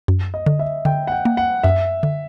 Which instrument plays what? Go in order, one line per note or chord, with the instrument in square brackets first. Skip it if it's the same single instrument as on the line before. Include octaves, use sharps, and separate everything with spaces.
[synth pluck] F#2
[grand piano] D#5
[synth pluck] D3
[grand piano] E5
[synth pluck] D3 [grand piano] G5
[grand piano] F#5
G5
[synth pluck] A#3
[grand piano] F#5
[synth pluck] F#2 [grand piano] E5
[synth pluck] D3